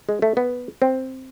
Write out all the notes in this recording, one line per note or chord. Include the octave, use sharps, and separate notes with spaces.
G#3
A3
B3
C4